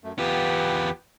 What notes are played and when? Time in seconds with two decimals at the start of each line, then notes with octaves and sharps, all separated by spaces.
0.04 F#2 A3
0.19 E2 B3 F4 G4 B4